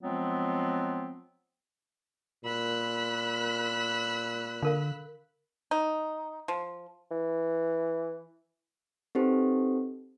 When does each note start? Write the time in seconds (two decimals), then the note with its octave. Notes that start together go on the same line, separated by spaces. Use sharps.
0.02 F3 F#3 G#3 B3 C4 F4
2.44 A#2 B5 E6 F#6
4.62 D3 A4 A#4 F5
5.71 D#4
6.48 F3
7.11 E3
9.15 C4 D#4 G4 A4 B4 C5